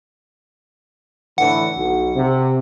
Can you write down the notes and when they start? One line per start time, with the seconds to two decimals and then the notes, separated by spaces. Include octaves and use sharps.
1.38 A2 D3 E3 F#5
1.76 B1
2.15 C3